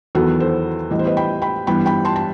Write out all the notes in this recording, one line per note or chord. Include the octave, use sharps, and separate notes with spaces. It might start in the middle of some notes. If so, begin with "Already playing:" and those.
E2 D#3 F#3 B3 F#4 A4
A4 C5
A2 E3 G3 B3 D#5
C5
B4 D#5
G5 B5
G5 B5
G2 E3 G3 B3 G5 B5
G5 B5
A5 C6
A5